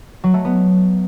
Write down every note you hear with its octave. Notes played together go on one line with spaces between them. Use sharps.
F#3
A3
B3